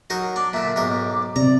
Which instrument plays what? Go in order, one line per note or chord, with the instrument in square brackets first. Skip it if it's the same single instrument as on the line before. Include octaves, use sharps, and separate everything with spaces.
[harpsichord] F#3 D#4 A#4
[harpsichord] D4 [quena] D6
[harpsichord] A#2 D3 [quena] E5
[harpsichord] B1 G#2 A#4 [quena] D6
[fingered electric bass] C3 [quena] D5 [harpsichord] A#5